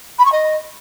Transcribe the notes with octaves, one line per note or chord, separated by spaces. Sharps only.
B5
C#6
D#5